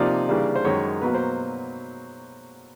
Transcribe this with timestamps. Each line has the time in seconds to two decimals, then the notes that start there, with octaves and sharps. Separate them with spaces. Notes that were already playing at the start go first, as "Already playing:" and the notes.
Already playing: C3 F3 A#3 D#4 D5
0.29 C#3 E3 G3 A#3 D4
0.56 C5
0.65 F#2 D#3 G#3 C#5
1.02 B2 F#3 A#3 B4
1.14 C5